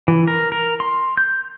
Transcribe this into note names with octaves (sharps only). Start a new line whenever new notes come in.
E3
A#4
A#4
C6
G6